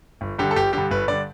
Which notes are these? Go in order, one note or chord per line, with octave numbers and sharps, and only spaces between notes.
G1
G2 D3 G4
A4
G1 G4
G2 D3 G4
G1 B4
G2 D3 D5